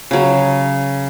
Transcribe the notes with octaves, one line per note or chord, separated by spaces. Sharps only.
C#3 F#3